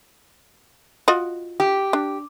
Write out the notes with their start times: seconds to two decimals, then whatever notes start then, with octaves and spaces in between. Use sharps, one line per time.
1.08 F4 F#4 D#5
1.60 G4
1.93 D4